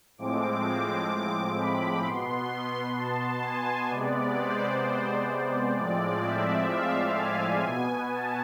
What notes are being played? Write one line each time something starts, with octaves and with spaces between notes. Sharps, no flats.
A2 F3 G#3 C4 D6
D6
B5
B2 B3 C6
A5
G#5
C3 G#3 B3 D5
C5
A2 F3 G#3 C4 D5
E5
F5
G#5
B2 B3
A5